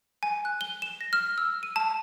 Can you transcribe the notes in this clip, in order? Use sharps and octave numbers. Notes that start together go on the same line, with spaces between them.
G#5
F#6
G7
E7
A#6
F6
E6
D#7
A5